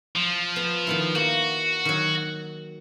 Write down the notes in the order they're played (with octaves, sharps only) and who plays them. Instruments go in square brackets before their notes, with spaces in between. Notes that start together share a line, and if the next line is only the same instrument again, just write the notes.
[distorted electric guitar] F3
[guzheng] B3
D#3 B3 E4
[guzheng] A#3 [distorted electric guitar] F#4
[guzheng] D#3 F#3